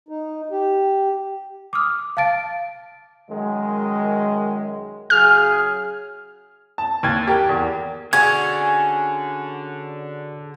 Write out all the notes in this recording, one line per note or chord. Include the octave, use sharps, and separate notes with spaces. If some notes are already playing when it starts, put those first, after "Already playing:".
D#4
G4
D6 D#6 F6
F5 A5 A6 D7
F#2 D#3 G#3
C#3 F#3 G#4 F6
A5
D#2 G#6 A6
G4 A#4
E2
D3 C#4 D4 F#4 G#4 G#6